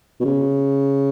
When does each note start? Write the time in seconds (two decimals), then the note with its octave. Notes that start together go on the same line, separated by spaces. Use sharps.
0.20 B2
0.25 C#3